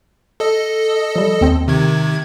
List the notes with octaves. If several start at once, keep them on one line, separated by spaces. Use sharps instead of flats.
A4 D#5
F3 G3
D#2 C4 C5
C3 D#3 G#6